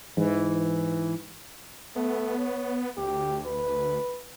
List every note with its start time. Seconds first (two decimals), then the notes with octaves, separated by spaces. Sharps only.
0.17 G#2 E3
1.96 A3 B3
2.38 C#5
2.97 D2 G4
3.46 B4